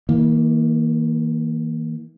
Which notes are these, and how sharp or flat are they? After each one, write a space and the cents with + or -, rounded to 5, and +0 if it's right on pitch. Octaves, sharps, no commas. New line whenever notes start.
E3 -45 A#3 +0